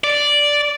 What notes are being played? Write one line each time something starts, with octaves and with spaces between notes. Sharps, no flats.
D5